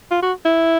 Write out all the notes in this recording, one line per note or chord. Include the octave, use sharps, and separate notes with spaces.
F4
F#4
E4